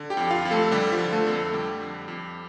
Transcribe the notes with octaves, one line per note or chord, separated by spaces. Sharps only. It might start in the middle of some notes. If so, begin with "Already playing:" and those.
Already playing: D3
G4 G5
F2
F4 F5
F2
A3 A4
D3 G3 G4
F3 F4
D3
A3 A4
F2
A3 A4
D3 G3 G4
F2
F2